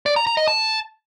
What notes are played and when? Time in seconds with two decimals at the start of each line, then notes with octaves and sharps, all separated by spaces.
0.06 D5
0.16 A#5
0.27 A#5
0.37 D#5
0.48 A5